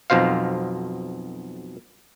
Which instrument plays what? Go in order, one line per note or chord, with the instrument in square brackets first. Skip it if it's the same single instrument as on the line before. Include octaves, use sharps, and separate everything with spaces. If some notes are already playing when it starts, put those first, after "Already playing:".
[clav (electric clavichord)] B1 F2 B2 C5 F5